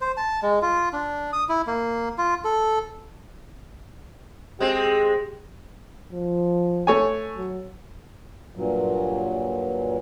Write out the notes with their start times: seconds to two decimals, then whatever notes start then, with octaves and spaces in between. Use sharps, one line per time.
0.01 C5
0.17 A5
0.43 G#3
0.62 F4
0.93 D4
1.33 D#6
1.49 E4
1.67 A#3
2.18 F4
2.45 A4
4.60 G#3 C4 G4
6.12 F3
6.87 A3 C#5 G#5
7.37 F#3
8.56 G2 A#2 F#3